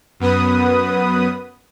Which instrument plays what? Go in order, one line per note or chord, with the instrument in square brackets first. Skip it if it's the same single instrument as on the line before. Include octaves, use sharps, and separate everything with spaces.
[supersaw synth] F#2 B3 B4 D#6